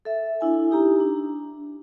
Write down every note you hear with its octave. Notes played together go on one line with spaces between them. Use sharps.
A4 E5
D4 E4 G#5
D#4 G4 A#5
D4